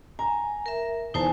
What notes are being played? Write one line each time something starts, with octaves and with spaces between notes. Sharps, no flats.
G#5 A#5
A#4 E5
E2 D#4 C5 G#5 A5